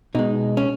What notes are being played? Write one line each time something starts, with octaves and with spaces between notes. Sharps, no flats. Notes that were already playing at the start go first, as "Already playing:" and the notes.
B2 G#3 D#4
C#4